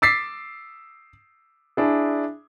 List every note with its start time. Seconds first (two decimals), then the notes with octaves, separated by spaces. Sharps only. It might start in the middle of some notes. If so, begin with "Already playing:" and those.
0.02 D6 E6 A6 B6 C7
1.77 D4 E4 G#4